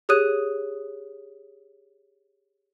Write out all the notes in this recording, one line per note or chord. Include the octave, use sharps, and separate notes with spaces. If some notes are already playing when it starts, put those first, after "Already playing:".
G4 G#4 C#5 D#6 F#6 D#7